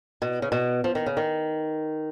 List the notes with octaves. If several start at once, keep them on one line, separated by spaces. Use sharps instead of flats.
B2
C#3
B2
F3
D#3
C#3
D#3